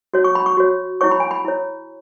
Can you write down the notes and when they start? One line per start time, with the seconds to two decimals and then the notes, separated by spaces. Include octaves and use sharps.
0.14 F#4 C#5
0.24 C#6
0.35 B5
0.46 C#6
0.57 F#4 C#5
1.01 E4 C#5 C#6
1.11 B5
1.20 G#5
1.31 B5
1.45 E4 C#5